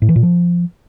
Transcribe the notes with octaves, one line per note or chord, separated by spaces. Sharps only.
A2
E3
A#2
F3